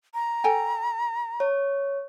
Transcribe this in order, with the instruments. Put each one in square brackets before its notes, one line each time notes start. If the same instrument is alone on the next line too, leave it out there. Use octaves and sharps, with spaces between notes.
[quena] A#5
[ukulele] A4 G5 G#5
[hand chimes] C#5